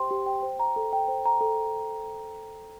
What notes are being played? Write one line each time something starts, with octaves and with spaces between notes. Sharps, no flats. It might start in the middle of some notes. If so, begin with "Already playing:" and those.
Already playing: G4 C5 G5 C6
G4
G5
C5
A#5
A4
G5
C5
A#5
A4